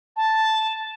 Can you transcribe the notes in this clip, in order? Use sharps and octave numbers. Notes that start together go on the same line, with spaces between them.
A5